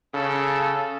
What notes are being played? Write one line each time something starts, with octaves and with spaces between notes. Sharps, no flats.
C#3 A4